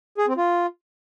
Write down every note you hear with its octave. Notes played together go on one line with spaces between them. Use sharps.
G#4
C4
F4